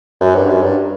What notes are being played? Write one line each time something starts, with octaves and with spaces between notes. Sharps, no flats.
F#2
G2
F#2
G2